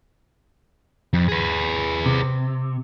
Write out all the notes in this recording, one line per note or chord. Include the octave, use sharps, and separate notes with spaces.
F2
G#4 B4
C3